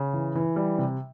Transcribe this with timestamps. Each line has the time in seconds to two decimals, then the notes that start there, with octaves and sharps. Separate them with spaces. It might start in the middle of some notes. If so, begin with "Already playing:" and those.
Already playing: C#3
0.13 E3
0.35 E3
0.56 G3
0.78 C3